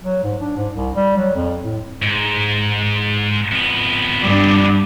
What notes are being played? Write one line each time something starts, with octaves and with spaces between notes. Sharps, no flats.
F#3
G#2
D4
G#2
C2
G3
F#3
F2
A2
G#2
F2 B3
G2 D4